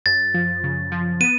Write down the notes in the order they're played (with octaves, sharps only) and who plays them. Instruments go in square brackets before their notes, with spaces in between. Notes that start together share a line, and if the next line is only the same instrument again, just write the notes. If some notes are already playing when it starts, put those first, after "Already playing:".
[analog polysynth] F#2 [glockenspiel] A6
[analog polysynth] F3
C#3
F3
[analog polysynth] B3 [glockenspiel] D#7